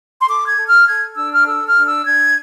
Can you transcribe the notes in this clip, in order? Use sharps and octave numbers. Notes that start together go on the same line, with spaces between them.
C6
A4 D6
G#6
A4
F6
A4 G#6
D4 E6
F6
D6
A4 E6
F6
D4
E6
D4 G#6